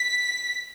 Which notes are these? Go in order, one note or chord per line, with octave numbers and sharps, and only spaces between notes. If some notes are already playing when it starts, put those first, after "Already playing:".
Already playing: B6